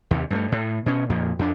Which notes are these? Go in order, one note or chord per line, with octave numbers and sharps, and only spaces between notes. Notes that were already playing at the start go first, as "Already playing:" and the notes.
D#2 C3
G2 G#3 A3
A2
B2 C#4
F2 A#2 F3 A#3
F2 D4